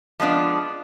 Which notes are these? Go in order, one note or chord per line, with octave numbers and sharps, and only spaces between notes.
F3 G#3 B3 D4 F4